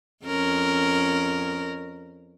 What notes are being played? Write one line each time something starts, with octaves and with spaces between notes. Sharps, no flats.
F2 C#4 A#4